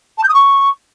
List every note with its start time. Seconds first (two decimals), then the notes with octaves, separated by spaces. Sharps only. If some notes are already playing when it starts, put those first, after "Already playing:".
0.18 A5
0.23 G6
0.29 D#6
0.34 C#6